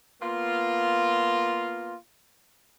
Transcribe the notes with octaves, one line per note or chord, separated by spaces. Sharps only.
A#3 B3 F4